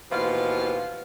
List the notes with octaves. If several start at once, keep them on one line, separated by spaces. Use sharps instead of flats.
D#2 B2 E3 F3 F4 F5